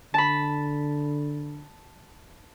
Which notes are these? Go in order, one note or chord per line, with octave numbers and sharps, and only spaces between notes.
D3 A5 B5